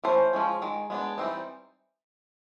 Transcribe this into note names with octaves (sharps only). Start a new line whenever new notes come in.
E3 A3 C#4 C5
F3 G#3 C#4
D#3 G#3
G#3 B3 D4
E3 G3 C4 D#4